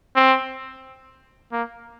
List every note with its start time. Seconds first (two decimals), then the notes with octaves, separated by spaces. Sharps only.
0.15 C4
1.52 A#3